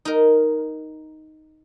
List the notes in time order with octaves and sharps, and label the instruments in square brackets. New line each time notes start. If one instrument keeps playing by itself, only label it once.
[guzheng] D#4 A#4